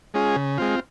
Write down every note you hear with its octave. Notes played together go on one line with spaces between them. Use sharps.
G#3 C#4 F4 G#4
C#3
G#3 C4 F4